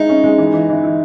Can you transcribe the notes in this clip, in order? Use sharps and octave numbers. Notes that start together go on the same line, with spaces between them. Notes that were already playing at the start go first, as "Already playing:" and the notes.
Already playing: G#3 D#4 E4
C#4
G#3
E3
E3
E3
E4